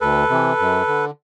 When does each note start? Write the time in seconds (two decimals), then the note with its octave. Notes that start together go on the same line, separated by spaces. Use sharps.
0.01 D2 A4 B4
0.29 C3 E3
0.59 F#2
0.88 D3